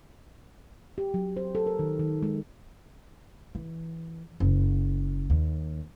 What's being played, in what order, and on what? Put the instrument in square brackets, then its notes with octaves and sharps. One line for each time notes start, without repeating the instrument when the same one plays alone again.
[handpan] G4
F#3
C5
A4
A#4
D#3
D#3
G#3
[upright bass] E3
F#1
D#2